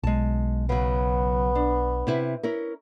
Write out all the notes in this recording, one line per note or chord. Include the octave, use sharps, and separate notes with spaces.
B1 G#3 A5
C#3 F#3 B3
D4
C3 E4 B4
C#4 E4 A#4